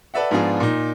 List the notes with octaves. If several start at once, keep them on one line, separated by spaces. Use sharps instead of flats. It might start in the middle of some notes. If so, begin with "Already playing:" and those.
A4 B4 D5 E5 F#5
G#2 F3 B3 D4 F4 G#4
A#2 D#4